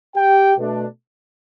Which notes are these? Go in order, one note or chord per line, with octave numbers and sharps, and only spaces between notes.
G4 G5
B2 A3 D4